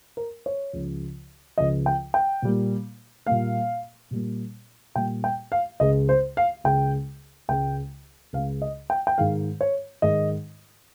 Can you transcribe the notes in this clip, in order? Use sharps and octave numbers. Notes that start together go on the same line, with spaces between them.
A#4
C#5
C#2 C#3 F3
C#2 C#3 F3 D#5
G5
G5
A#2 G3 A#3
A#2 G3 A#3 F5
A#2 G3 A#3
A#2 G3 A#3 G5
G5
F5
C#2 C#3 G#3 D#5
C5
F5
C#2 C#3 G#3 G5
C#2 C#3 G#3 G5
C#2 C#3 G#3 F5
D#5
G5
G5
G#2 D#3 G#3 F5
C#5
G#2 D#3 G#3 D#5